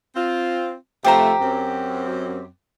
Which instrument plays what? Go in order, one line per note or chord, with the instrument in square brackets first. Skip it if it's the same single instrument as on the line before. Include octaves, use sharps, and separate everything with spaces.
[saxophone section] C4 F4
[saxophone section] C3 F3 A3 [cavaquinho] G4 C5 A#5
[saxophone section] F#2 C4